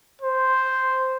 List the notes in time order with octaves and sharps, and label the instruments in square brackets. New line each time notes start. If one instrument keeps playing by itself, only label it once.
[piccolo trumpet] C5